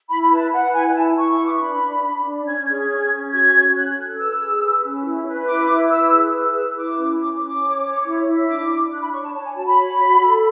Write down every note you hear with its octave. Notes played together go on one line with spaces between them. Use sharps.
E4 B5
B5
B4 A5
B4 F#5
E4 G#5
G#5
E4 A5
E4 C#6
B4
D6
C#6
D4 B5
D4
D4
D4
C#4 G#6
G#4 G#6
C#4
C#4
F#4 G#6
C#4
C#4 F#6
A4
B4 E6
G#4
B4
C#4
E4
B4
E4 D6
E4
B4 E6
G#4
B4 E6
B4 E6
E4 D6
C#4
C#4 D6
C#4
C#5
C#5
E4
E4
D4 D6
D4
D4 F#6
B5
C#5 C#6
A5
C#5 A5
G#5
F#4 A5
B5
C#5
F#4
A4